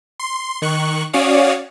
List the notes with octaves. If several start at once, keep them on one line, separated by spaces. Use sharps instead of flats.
C6
D#3 C#6 F#6
C#4 F#4 C#5 D5 F5 D#6